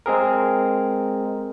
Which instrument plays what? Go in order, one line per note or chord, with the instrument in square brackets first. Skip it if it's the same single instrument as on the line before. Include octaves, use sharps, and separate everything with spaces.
[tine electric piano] G#3 C4 G#4 A#4